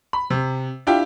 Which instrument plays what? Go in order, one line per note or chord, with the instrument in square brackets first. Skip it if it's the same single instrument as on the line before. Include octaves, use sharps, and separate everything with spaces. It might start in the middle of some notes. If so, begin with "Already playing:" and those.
[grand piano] B5
C3
D4 E4 F4 G4 G5